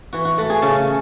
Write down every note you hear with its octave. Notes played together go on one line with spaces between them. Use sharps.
E3 F#4
F#4
A3 F#4
G#4
C#3 A4